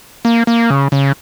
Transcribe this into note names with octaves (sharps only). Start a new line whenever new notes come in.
A#3
A#3
C#3
C#3